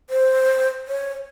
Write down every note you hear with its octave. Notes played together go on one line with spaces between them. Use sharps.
C5
C#5